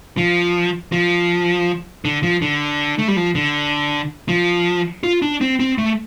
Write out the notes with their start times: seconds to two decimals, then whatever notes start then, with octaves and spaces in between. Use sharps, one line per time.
0.17 F3
0.92 F3
2.05 D3
2.23 F3
2.42 D3
2.98 A3
3.08 G3
3.16 F3
3.35 D3
4.29 F3
5.03 F4
5.22 D4
5.41 C4
5.60 C4
5.78 A3